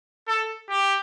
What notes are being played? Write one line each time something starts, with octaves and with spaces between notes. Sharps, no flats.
A4
G4